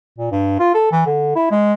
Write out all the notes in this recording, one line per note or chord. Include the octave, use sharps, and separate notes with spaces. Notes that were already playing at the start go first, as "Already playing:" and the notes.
A#2
G2
F4
A4
E3
D3
E4
G#3